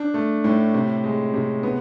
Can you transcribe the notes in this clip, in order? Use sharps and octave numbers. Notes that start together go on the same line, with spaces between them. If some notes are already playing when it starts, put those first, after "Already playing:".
Already playing: D4
A3
A2
C3
G#3
C3
B3